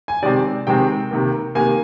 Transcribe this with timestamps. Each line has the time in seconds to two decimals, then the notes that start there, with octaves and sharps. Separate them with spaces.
0.08 G#5
0.23 C3 D#3 G#3 C4 D5
0.67 C3 D#3 G#3 C4 G5
1.11 C3 D#3 A#3
1.55 C3 D#3 A#3 G#5